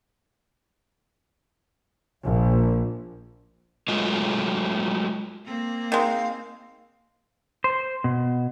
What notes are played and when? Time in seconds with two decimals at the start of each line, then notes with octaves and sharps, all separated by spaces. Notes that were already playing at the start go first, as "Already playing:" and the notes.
2.24 A#1
3.88 F#3 G#3 A3 F4 D#5
5.45 A#3 C4
5.92 D#3 G#3 F5
7.64 C5
8.04 B2